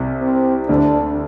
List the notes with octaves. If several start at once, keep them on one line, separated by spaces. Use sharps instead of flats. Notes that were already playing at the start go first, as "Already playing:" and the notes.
Already playing: C2 C3
C4
D2 D3 D4